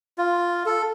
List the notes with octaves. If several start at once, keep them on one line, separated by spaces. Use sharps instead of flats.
F4
A4